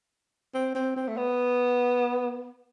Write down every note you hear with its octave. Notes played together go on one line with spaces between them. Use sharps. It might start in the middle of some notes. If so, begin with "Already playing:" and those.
C4
C4
C4
A3
B3